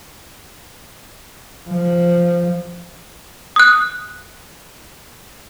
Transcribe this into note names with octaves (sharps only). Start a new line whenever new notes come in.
F3
D#6 F#6